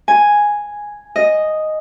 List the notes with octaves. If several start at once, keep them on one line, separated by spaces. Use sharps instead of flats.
G#5
D#5